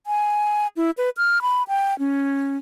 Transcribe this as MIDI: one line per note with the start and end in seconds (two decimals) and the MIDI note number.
0.07 0.67 80
0.77 0.91 64
0.98 1.10 71
1.17 1.42 89
1.42 1.63 83
1.68 1.97 79
1.99 2.57 61